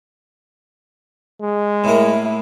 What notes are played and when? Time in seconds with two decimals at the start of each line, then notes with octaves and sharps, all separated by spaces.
1.42 G#3
1.84 A2 A#3 E4